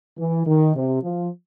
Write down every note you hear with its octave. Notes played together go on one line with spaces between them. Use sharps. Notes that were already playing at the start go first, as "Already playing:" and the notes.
E3
D#3
C3
F3